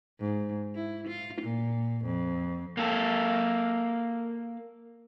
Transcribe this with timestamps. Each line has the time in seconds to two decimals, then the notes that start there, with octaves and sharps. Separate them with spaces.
0.20 G#2
0.75 E4
1.07 F4
1.42 A#2
2.05 F2
2.77 A#3 A4